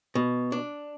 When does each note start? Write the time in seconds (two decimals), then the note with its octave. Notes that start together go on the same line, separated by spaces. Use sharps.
0.15 B2
0.52 D4